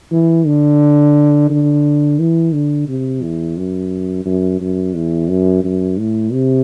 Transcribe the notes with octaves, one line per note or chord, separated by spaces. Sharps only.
E3
D3
D3
E3
D3
C3
E2
F#2
F#2
F#2
E2
F#2
F#2
A2
C3